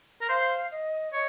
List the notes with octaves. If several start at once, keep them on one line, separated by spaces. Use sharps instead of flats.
A#4
C5 F5
D#5
C#5 D#5